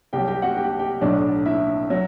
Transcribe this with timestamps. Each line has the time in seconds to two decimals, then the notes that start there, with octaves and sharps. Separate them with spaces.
0.13 C2 C3 F#3 G4 G5
0.28 G4 G5
0.42 F#4 F#5
0.57 G4 G5
0.79 G4 G5
1.01 B1 A2 F#3 D4 D5
1.46 E4 E5
1.90 F#3